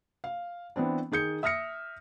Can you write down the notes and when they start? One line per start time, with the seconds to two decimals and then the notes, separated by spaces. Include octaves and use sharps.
0.24 F5
0.76 E3 B3 C4 D4
1.11 D#3 G#4 G6 C#7
1.43 E5 D#6 F6 A#6 C#7